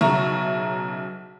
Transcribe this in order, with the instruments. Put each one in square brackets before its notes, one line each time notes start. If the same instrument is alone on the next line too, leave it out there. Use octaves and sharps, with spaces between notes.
[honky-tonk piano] B1 C#3 E5 A#5 C#6